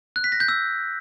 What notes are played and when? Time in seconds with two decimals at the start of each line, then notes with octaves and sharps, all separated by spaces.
0.16 F#6
0.24 B6
0.32 A#6
0.40 G6
0.49 E6